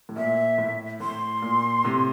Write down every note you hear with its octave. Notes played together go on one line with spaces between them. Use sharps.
A2
A#2 E5
A2
A2 C6
A#2
A2 C3